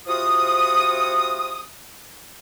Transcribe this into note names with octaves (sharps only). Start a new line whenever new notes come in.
C3 F3 F4 F#4 D#6